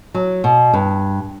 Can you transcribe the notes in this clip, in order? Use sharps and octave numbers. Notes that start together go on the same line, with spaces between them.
F#3
B2
G2